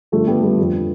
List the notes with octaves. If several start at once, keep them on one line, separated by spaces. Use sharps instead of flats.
G2 D3 F3 A3
G3 B3
G3 B3
F2 D3 F3